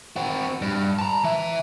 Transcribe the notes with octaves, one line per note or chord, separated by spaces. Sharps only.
C4 F#4
G2
A5 A#5
E3 E5